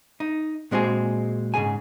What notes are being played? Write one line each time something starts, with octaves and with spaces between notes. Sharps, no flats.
D#4
A#2 G#3 C4 F#4 G#4
G#2 C#3 G#4 G#5